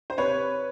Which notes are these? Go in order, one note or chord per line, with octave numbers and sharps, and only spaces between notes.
C5
C3 B4 C#5